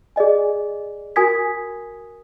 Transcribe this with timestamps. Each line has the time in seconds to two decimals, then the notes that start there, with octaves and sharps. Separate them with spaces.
0.16 G#4 D5 D#5 G#5
1.16 F#4 A#4 G#5 D#6 G#6 B6